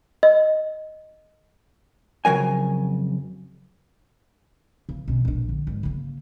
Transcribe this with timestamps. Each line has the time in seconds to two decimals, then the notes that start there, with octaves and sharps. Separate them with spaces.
0.23 D#5
2.25 F2 C#3 F#3 A#4 G#5
4.89 C#3
5.08 B2 C#4
5.25 A#1 D4
5.49 D3
5.67 G#1
5.83 C#3 A#3